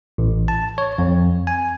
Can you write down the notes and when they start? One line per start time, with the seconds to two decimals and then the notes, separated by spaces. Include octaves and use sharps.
0.18 A1
0.48 A5
0.78 C#5
0.98 F2
1.47 G#5